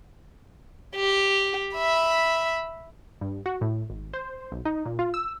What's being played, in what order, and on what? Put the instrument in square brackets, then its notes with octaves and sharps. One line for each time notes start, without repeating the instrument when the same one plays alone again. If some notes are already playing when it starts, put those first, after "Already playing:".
[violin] G4
E5 B5
[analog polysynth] G2
F#4
A2
G#1
C5
B1
D#4
A#2
F4
E6